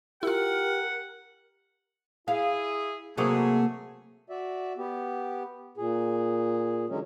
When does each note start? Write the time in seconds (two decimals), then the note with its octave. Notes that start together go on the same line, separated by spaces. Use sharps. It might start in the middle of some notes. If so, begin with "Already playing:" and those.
0.23 E4 F4 G4 A#4 F#5
2.28 E4 G#4 F5
3.17 C3 F#3 A3 A#3 F#4 G#4
4.30 F#4 D5 E5
4.77 B3 G4
5.77 A#2 G#4
6.89 D3 E3 F#3 G#3 C#4